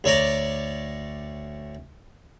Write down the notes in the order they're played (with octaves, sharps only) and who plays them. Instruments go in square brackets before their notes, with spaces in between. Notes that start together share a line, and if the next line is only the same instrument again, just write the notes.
[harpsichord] D2 C#5 D5 A#5 D6